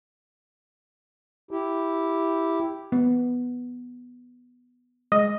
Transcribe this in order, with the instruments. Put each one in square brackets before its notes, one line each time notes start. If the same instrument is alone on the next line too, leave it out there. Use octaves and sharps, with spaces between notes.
[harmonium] E4 G4
[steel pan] B3
[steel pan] G#3 [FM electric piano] D#5